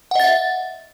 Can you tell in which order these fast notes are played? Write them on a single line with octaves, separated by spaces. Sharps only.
F#5 D#5 A6 E5